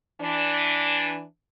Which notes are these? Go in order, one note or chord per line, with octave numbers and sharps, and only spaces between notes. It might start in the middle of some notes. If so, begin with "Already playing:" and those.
E3 D4